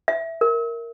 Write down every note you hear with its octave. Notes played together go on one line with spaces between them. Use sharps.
E5
A#4